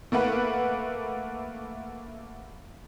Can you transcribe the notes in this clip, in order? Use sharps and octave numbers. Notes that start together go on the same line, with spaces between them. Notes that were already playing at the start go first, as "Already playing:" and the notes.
A3 A#3 B4 F#5